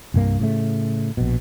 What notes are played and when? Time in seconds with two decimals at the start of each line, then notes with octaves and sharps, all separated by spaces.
0.14 C2 G2 A#3
0.40 A2 C#3 A3
1.17 A#1 B2